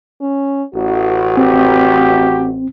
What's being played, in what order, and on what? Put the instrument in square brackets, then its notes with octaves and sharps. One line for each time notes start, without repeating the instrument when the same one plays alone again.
[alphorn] C#4
[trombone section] A1 [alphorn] F#4
[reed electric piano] C4 [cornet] G4